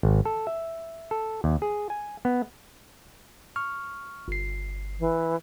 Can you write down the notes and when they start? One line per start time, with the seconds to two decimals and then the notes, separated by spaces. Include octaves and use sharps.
0.03 G#1
0.25 A4
0.47 E5
1.11 A4
1.44 D#2
1.62 G#4
1.90 G#5
2.25 B3
3.56 C#6 F6
4.28 G1 C7
5.00 E3